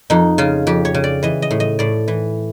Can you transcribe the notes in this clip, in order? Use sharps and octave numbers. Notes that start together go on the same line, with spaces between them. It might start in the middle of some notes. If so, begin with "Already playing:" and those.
F2 D#4
C#3 F4
F2 G4
C#5
C#3
D5
E3 D#5
D#5
A2
D#5
A2 D5
E3